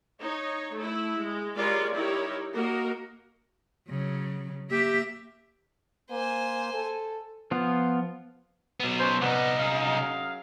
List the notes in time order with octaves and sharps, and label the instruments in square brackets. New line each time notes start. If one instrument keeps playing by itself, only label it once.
[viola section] D#4 C#5
A3 E4
G#3
G3 G#3 F4 A#4 C#5 D5
D#4 E4 G4 A#4 C#5
A#3 F#4 A#4 D#5
[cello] C#3 F#3
[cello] A#3 E5 [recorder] G4
[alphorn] A#3 [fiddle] C5 G#5
[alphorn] A4
[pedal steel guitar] F3 B3 F4
[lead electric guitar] F#3 B3
[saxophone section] C#4 F#4 C5
[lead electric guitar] C2 D#4 [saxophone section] G3 B3
[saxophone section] F#2 G#4 F5